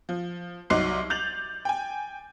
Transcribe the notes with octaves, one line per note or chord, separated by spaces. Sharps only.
F3
C2 F#3 D#4 C6 D6 C7
G6 A6 F7 F#7
G5 G#5